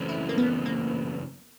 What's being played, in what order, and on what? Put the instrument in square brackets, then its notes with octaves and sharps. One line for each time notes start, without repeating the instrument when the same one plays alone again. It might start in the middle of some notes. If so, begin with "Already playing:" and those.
Already playing: [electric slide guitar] F#2 C#3 E3 A3 C4
[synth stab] E4
A#3
B3
A#3